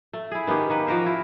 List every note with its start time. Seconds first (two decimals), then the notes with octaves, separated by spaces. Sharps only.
0.13 A3
0.31 E4 G#4
0.47 D#3 B3 C#4 G4
0.70 D#3 A#3 B4
0.87 F3 F#4 A#4 C5
1.06 E4